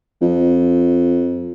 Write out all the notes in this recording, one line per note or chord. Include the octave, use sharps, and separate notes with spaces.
F2